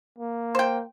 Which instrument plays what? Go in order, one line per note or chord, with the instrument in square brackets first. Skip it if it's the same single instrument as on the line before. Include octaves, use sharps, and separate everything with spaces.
[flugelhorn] A#3
[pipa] C5 G5